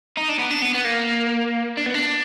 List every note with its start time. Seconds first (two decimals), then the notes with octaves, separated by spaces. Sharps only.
0.17 D#4
0.29 D4
0.39 B3
0.51 D4
0.62 B3
0.75 B3
0.85 A#3
1.77 D4
1.86 B3
1.94 D4